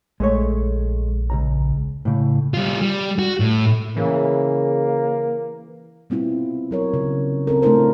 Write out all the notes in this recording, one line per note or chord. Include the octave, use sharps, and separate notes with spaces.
A#1 G#3 A3 C#5
C#2 G#2 A#5
A2 C#3
G3 F4
G3
F#4
A2
C#3 E3 A#3
G3 B3 C4 E4 F4
F#3 A#4 C#5
C#3
C4 A4 A#4
A3 D4 E4 F4 A#4 C5